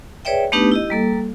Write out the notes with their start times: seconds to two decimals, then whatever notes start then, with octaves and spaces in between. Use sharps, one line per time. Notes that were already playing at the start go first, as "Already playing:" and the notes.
0.25 G#4 B4 C#5 D5 E5 G5
0.52 A3 B3 D4 D#4 G4 B4
0.72 E4 G4 D#5
0.90 G3 A#3 A4